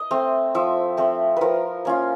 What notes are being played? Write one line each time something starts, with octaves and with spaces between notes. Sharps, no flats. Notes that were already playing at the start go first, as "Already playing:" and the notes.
Already playing: D#5
A3 C4
F3 E5
A3 C4
F3 A#4 B4
A#3 C#4 F4